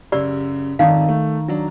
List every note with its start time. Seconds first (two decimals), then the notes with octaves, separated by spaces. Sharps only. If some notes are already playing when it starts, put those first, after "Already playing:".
0.12 F#2 C#3 G4 D5 E6
0.79 G#1 F2 D#3 F5 A5
1.09 A3
1.48 F#3 D4